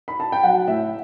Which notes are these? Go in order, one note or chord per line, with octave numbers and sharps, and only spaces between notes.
B5
A5
G5
F#3 F#5
A2 E5